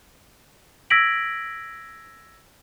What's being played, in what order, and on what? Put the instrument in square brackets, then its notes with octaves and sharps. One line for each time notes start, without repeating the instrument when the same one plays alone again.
[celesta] E6 G#6 A#6 B6 D7 F#7